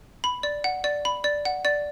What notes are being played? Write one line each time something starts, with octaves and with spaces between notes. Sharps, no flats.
B5
D5
F#5
D5
B5
D5
F#5
D5